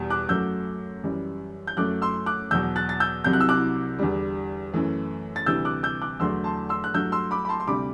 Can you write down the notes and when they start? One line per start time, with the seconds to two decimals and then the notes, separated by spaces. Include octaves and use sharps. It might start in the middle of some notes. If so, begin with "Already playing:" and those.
Already playing: E2 B2 G3
0.10 D6 F#6
0.29 F#2 F#3 A3 E6 G6
1.04 F#2 E3 G3
1.67 G6
1.77 F#2 F#3 A3 D6 F#6
2.02 C6 E6
2.26 D6 F#6
2.51 E2 B2 F#3 E6 G6
2.76 F#6 A6
2.89 A6
3.00 E6 G6
3.24 C2 C3 F#3 G6
3.33 F#6
3.40 E6
3.49 D6 F#6
3.98 E2 D3 G3
4.73 F#2 E3 A3
5.36 A6
5.46 D2 C3 E3 G3 E6 G6
5.65 D6 F#6
5.83 E6 G6
6.02 D6 F#6
6.20 E2 D3 F#3 A3 C6 E6
6.44 A5 C6
6.69 C6 E6
6.84 F#6
6.94 G2 F#3 A3 E6 G6
7.12 C6 E6
7.31 B5 D6
7.45 B5
7.49 A5 C6
7.60 C6
7.67 D2 C3 G3 B5 D6